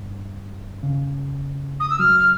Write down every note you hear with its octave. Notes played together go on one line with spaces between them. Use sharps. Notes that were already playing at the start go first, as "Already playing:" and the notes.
Already playing: G2
C#3
D#6
E6
F#3 F6
F6